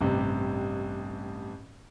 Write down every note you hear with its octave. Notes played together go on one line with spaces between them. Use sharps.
A1 G2 C3